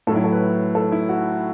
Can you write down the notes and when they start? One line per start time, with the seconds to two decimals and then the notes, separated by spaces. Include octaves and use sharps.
0.07 A2 A4
0.10 F#3
0.16 E4
0.24 A4
0.32 B4
0.75 A4
0.92 E4
1.09 F#4